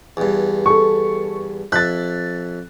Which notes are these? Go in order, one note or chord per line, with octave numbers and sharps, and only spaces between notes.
E2 G2
A4 C#6
F2 E5 F#6 A6